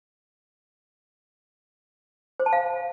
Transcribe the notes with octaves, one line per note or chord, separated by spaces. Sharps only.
C5
A5
F5